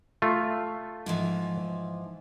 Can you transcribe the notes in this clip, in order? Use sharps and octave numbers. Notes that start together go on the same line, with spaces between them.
A3 F4
G#2 E3 F3